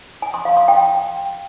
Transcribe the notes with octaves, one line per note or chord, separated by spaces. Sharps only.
G#5
C6
F5
C6
G5